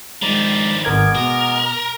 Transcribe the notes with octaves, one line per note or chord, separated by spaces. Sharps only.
D#3 F3 G#3 D5 A#5 B5
G#1 G#3 B3 A#4 D6 G#6
B2 A#4